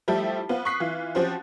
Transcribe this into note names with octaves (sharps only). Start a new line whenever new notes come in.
F3 G3 A3 E4 G4 A4
B3 C4 F4
C#6 D#6 F#6 B6 C7
E3 F4
F3 C4 C#4 F#4 G4 C5